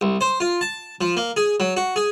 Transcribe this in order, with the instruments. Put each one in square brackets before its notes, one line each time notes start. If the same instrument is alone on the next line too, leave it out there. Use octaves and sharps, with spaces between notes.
[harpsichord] C2
C5
F4
A5
F3
A#3
G#4
F#3
F#4
G#4